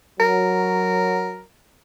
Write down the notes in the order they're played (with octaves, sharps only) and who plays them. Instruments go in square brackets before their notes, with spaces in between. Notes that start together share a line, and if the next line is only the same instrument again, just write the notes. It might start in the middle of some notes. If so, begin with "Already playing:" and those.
[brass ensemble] F#3 [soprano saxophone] A#4